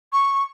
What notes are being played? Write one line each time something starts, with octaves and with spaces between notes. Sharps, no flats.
C#6